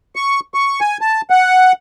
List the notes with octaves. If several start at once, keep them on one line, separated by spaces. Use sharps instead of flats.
C#6
C#6
G#5
A5
F#5